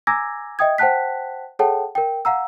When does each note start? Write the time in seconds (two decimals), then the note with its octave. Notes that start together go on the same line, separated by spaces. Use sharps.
0.07 G#5 A#5 D6 E6 G#6 A#6
0.59 D#5 E5 G5 D#6 G#6
0.78 C5 F#5 G5 A5 F#6 B6
1.59 G#4 A4 C#5 F#5 G5 A5
1.95 A#4 G5
2.25 F5 F#5 A#5 E6